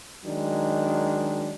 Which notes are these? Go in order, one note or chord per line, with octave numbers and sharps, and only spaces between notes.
D#3 F#3 G#3 D4